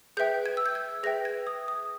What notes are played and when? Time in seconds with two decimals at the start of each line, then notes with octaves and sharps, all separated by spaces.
0.17 G#4 B4 E5 G5 G6
0.46 G#6
0.57 E6
0.66 G6
0.75 G#6
1.03 G#4 B4 E5 G5 A#6
1.25 G#6
1.47 D#6
1.68 D#6